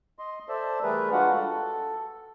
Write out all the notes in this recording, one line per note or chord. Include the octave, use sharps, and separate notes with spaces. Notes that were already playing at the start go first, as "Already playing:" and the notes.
D#5 C6
A4 C5 D5 E5
E3 G3 A3 G#4 A#4 B4
G3 G#3 D4 F4 F#4 F#5
A4